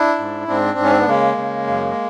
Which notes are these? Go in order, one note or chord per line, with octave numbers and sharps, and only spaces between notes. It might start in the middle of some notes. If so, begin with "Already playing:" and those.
Already playing: D4 E4
G#2
G#2 C4 D4
G#2 C#4
C4
B3
C#3 G#3 A#3
C#3
F#2